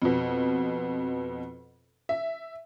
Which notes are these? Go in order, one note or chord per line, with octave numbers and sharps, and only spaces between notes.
F2 B2
E5